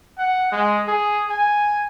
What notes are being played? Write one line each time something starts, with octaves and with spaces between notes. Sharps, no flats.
F#5
G#3
G#4
G#5